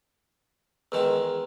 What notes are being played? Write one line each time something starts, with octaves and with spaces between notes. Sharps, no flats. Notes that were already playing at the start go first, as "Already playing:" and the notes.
E2 D#3 G#3